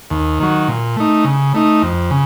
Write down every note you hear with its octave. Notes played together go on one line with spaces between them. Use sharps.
D#2
D#3 F#3
A#2
A3 D#4
C#3
A3 D#4
F2
C#3